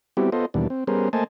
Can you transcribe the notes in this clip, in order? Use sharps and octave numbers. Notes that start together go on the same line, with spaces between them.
G3 B3 C4 E4 F#4 G4
B3 F4 A4 C5 D#5
D#2 B2 E3 G3 D4
C4
G3 B3 C#4 G#4 A#4 C5
A3 A#3 C5 D#5 G#5 A5